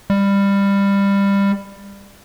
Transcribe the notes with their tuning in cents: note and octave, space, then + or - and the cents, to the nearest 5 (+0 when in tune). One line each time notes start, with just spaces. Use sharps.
G3 +20